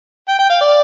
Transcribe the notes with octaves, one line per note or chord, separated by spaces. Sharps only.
G5
G5
F5
D5